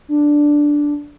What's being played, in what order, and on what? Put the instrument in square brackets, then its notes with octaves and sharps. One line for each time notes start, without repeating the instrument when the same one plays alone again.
[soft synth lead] D4